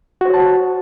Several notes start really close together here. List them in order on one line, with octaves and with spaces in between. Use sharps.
F#4 C5 C#5 A5